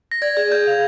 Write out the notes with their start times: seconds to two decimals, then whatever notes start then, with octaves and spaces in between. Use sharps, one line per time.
0.12 A#6
0.22 D5 G#6
0.37 G#4
0.52 G#4 G6
0.67 F5